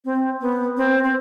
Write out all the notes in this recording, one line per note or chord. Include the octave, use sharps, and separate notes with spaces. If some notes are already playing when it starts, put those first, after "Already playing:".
C4
B3
C4
C4